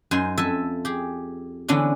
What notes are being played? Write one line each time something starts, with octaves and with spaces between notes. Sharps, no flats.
F#2 D#4 C5 G#5
F2 A4 E5 G#5
G4 G#4
D3 E3 B3 C#4 D4